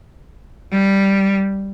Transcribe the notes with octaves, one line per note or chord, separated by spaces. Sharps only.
G3